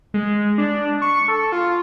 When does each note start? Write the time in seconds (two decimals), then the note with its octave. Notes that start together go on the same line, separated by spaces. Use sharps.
0.14 G#3
0.58 D4
1.02 C#6
1.28 A4
1.52 F4